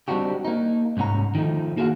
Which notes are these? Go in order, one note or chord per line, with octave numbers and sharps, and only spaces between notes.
G3 C4 D4 D#4 F#4 G4
A#3 D#4
C2 G#2 C#4 F#5 A#5
D#3 F3 A3 D#4
A#3 F#4 G#4 A#4 F5 F#5